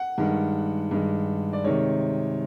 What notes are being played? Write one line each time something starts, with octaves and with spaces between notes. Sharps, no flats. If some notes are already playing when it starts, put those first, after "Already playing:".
Already playing: F#5
G2 D#3 G#3
G2 D#3 G#3
D5
C3 D#3 G#3 C#5